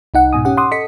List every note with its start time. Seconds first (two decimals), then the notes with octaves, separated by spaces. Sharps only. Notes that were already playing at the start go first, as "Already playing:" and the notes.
0.14 C2 D#4 F#5
0.33 G#2 B2 G#5 D#6
0.45 C#4 G4 F#5
0.57 F#5 C6 D6 D#6
0.72 A4 D#5 B6 C#7